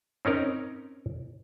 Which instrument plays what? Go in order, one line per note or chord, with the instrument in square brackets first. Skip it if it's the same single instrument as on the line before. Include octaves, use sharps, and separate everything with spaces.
[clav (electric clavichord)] C4 C#4 D#4 A#4